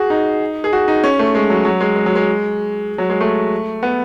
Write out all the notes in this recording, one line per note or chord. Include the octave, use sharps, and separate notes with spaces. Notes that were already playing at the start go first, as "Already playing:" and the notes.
Already playing: F#4 G#4
D#4
G#4
F#4
D#4
C#4
A3
G#3
F#3
F#3
G#3
G#3
F#3
G#3
F#3
G#3
A3
B3